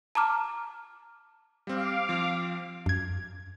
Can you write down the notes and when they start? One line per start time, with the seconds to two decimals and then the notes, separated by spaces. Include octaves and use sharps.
0.15 A5 A#5 D6 F6
1.67 G3 C4 F5 D6
2.09 F3 C4
2.86 F#2 G#6